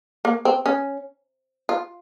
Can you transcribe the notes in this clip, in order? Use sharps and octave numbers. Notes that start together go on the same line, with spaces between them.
A#3
C4
C#4
F4